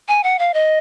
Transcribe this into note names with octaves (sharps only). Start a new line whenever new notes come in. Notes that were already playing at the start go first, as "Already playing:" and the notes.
G#5
F#5
F5
D#5